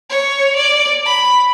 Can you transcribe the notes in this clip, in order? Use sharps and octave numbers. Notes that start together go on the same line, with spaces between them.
C#5
D5
B5